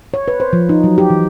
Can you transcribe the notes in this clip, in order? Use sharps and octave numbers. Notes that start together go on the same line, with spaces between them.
C#5
B4
C5
F3
D#4
F#3
G4
E3